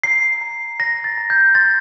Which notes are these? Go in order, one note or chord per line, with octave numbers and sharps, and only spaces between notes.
A#5 C7
A#5
A#5 A#6
A6
A#5
G6
C6 A6